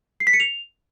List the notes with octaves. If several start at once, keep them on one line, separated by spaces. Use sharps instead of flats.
C7
B6
C#7
F7